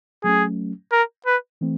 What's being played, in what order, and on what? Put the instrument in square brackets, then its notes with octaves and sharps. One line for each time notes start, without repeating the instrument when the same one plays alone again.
[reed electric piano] F#3 A3 C#4 [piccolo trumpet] G#4
[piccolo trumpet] A#4
B4
[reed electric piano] E3 A3 C4